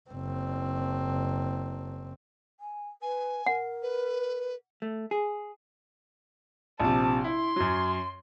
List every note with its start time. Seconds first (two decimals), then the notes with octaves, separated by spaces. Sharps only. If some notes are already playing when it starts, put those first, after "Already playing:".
0.10 F#1 C4
2.60 G#5
3.02 B4 G#5
3.46 A#4 F#5
3.82 B4
4.82 A3
5.11 G#4
6.80 A#1 C3 A5
7.24 E4 C6
7.56 F#2 F#3